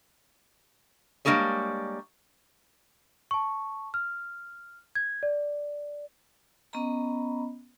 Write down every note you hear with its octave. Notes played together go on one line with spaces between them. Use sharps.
G3 G#3 A#3 D4 G#4 C#5
A5 C#6
F6
G#6
D5
B3 C#4 D#5 A#5 B5